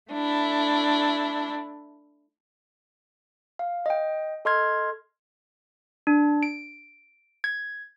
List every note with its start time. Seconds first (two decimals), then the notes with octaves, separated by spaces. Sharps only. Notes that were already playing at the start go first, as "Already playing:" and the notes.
0.11 A3 D4 E4
3.59 F5
3.86 D#5 G5
4.45 A4 D#5 C6 F6 G#6
6.07 D4
6.43 D7
7.44 G#6